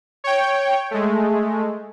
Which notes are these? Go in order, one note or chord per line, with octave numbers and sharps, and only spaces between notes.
C#5 G5
G#3 A3